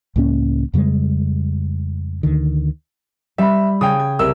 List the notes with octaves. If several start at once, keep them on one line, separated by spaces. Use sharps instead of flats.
C#2 A2 A#3 C#4
F2 C#3 G3 G#3
D2 D3 D#3
G3 E5 B5
C#3 G5 D#6 G#6
G#6
C2 A#4 E6